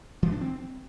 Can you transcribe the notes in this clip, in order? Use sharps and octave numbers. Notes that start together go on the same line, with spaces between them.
E3
D4
C4